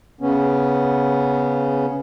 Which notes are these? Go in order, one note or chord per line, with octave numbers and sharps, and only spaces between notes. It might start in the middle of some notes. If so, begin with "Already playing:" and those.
C#3 B3 C#4